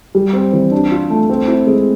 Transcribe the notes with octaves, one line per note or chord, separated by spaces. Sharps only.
G3
C4
E3
D4
F4
A3
C4
E4
G#3